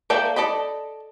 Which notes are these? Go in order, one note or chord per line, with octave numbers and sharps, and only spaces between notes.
A#3 A4 D5 E5 G5
A4 D5 D#5 B5